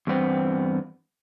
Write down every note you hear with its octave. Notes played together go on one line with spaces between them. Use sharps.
E2 G2 B3 C4